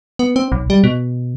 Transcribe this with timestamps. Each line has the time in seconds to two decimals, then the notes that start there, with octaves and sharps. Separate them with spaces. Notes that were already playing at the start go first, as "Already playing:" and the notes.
0.19 B3
0.36 C4
0.52 B1
0.70 G3
0.84 B2